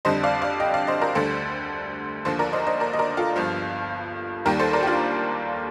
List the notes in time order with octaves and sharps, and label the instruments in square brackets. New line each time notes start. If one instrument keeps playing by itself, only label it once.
[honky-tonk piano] F2 D3 G3 C5 D#5
D5 F5
D5 F5
D#5 G5
D5 F5
C5 D#5
A#4 D5
D2 D3 G3 A4 C5
D#2 D3 F3 A4 C5
A#4 D5
C5 D#5
C5 D#5
A#4 D5
D#5
A#4 D5
F4 A4
G1 G2 F3
D#2 D#3 G3 G4 A#4
A4 C5
A#4 D5
G4
D4 F4